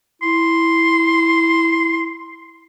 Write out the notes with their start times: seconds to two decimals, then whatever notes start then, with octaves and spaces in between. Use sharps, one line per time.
0.22 E4 C6